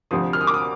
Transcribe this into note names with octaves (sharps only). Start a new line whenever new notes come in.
D2 C3 F3 D#6
F6
D#6
D6
D#6